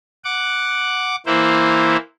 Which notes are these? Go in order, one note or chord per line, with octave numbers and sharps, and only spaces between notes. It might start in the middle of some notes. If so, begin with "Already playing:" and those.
F#5 D6
E3 A#3 E4 C5